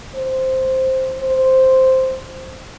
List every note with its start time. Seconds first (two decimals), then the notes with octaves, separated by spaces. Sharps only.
0.15 C5
1.19 C5